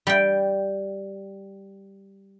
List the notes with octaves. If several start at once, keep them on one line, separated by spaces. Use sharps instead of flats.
G3 G5